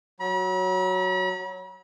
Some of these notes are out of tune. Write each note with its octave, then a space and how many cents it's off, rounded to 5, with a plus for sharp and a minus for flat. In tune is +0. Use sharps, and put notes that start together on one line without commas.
F#3 +0 B5 -45